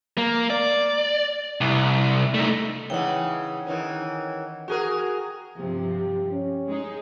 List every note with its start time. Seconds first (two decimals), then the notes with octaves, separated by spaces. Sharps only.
0.18 A#3
0.50 D5
1.61 C2
2.34 A3 D#4
2.90 C#3 E3 D#4 F#5 G5
3.66 D#3 E3 C#4
4.68 F#4 G#4 A#4
5.60 G2 C3 F3 G4
6.31 C#4
6.69 G#3 D#4 G#4